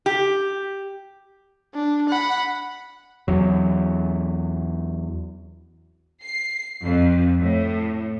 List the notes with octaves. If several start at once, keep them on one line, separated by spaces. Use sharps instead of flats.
G4
D4
F#5 B5
E2 F#3
C7
F2
A2